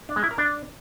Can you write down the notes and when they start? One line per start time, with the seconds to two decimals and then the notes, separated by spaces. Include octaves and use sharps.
0.09 D4
0.16 G#3
0.24 E4
0.31 A#4
0.38 D4